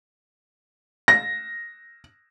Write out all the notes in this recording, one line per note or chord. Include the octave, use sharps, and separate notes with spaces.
A#6